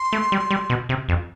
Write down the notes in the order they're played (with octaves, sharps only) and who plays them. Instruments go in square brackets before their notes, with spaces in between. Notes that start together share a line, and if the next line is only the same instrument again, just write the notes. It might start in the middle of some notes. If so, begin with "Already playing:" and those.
Already playing: [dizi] C6
[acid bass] A3
G3
G3
B2
C3
F2